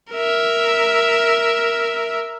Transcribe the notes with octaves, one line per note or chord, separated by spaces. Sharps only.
A#4 E5